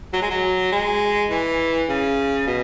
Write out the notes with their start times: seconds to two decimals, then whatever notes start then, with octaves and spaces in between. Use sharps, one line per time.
0.13 F#3
0.22 G#3
0.30 F#3
0.72 G#3
1.30 E3
1.89 C#3
2.47 B2